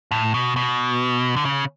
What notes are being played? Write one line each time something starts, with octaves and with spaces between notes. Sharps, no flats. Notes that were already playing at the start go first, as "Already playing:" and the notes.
A2
B2
B2
D3
C#3